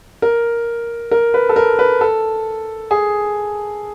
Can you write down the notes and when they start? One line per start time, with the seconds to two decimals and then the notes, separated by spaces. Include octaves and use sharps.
0.22 A#4
1.11 A#4
1.34 B4
1.49 A4
1.56 A#4
1.79 B4
2.01 A4
2.91 G#4